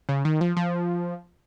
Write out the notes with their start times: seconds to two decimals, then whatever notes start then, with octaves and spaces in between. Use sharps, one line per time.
0.09 C#3
0.25 D#3
0.41 F3
0.57 F3